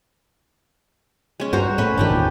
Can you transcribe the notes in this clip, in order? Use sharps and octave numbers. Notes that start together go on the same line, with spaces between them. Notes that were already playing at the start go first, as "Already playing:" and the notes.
G#3 C#4
G2 F#4 C5 A#5
A2 C#4 B4
G1 G#2 D#3 D4 D#4 G4
E2 A#2